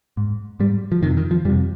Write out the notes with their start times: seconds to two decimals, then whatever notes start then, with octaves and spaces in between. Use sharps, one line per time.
0.17 G#2
0.60 G#2 G3
0.92 F3
1.02 F2 C3 D#3
1.17 D#3
1.31 F3
1.45 F2 G3
1.49 C3